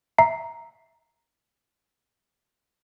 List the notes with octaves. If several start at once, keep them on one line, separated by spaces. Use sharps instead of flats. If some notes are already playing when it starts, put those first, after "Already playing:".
E5 A#5 C7